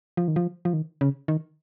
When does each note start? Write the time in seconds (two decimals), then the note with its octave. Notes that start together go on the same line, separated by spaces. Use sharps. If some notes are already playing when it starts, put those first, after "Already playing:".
0.17 F3
0.28 D#3
0.36 F3
0.65 F3
0.73 D#3
1.01 C#3
1.28 D#3